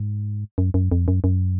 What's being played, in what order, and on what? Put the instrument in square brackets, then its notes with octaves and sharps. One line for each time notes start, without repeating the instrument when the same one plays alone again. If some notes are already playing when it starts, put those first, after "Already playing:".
Already playing: [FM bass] G#2
F#2
F#2
F2
F#2
F#2